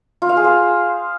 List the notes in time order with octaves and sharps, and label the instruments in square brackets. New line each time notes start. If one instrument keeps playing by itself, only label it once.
[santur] F4
F5
G#4
C5